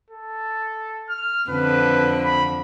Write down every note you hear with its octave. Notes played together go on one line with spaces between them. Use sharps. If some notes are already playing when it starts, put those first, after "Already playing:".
A4
F6
F2 D3 B4
B5